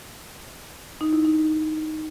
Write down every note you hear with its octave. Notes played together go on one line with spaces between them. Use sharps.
D#4
E4
D#4